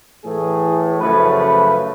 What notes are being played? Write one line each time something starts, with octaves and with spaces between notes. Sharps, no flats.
A2 E3 A3 G#4
F#2 C#3 F3 A3 B4
B4